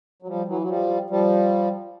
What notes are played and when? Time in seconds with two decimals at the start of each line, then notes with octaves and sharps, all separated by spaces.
0.23 F#3
0.27 F3 G3
0.48 E3 F#3
0.61 F#3
0.69 F3 G3
1.10 F3 G3